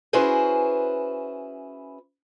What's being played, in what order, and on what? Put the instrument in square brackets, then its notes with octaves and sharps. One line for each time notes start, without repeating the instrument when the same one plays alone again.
[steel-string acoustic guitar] C#4 E4 F#4 G#4 B4 C5